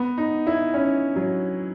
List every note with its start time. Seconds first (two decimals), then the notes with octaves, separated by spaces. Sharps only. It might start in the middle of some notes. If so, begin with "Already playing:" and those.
Already playing: B3
0.18 D#4
0.47 E4
0.74 C#4
1.16 F#3